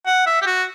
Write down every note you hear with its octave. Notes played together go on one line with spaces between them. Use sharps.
F#5
E5
G4
F#4